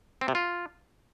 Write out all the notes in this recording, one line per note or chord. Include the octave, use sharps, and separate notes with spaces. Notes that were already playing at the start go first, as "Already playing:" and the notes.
C4
C3
F4